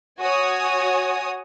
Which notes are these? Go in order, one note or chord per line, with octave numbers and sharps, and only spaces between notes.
F#4 C#5 G#5 D#6